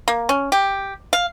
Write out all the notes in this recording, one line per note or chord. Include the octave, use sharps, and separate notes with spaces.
A#3
C#4
G4
F5